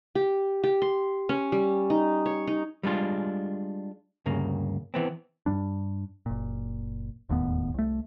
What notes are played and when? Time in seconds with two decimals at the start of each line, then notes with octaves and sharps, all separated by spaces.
0.15 G4
0.64 G4
0.82 C6
1.29 C#4
1.52 G3
1.90 D#4
2.26 C#5
2.47 D#4
2.83 G3 G#3 D4 F4
4.26 D2 G2 C#3 A#3
4.94 E3 B3 C4
5.46 G2 G3 D4
6.26 F#1 A#2
7.29 E1 D#2 A2 B3
7.74 C2 A3